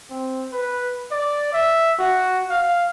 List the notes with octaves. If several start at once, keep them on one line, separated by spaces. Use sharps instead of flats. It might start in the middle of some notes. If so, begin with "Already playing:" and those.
C4
B4
D5
E5
F#4
F5